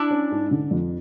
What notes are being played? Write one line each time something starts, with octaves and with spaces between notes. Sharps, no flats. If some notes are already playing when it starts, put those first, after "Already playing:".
Already playing: D4 E4
C#4
G#2
D3
F2